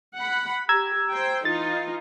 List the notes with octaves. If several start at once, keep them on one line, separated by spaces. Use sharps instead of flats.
F#5 B5
G4 A#5 E6 G#6
C5 G5
E3 D#4 F4 A6